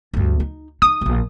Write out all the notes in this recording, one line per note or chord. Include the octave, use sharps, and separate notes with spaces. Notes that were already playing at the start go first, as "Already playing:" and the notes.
D2 G2
D#4
D#4 D#6
E1 A#1